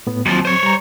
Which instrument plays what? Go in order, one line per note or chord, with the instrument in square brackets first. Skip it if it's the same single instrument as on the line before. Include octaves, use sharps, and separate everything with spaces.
[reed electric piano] A2 B3
[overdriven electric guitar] D#2 F3 [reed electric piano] F#3 C4
[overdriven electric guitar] C5 C#5
[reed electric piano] G3 A#5